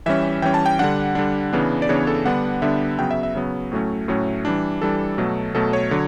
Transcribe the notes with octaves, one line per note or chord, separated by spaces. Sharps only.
E3 G3 C#4 E5
E3 G3 C#4 G5
A5
G5
D3 G3 D4 F#5
D3 G3 D4
C#3 E3 B3 D4
D5
C#3 E3 B3 D4 C#5
A4
D3 G3 B3 D4 F#5
D3 G3 B3 D4 E5
C#3 F#3 B3 G5
E5
E5
C#3 F#3 B3
A2 F#3 A3 C#4
A2 F#3 A3 C#4
E3 G3 D4
E3 G3 D4 A4
B2 F#3 A3
B2 F#3 A3 A4
C#5
D3 F#3